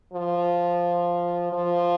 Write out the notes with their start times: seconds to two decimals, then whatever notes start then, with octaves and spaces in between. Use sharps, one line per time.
0.14 F3
1.53 F3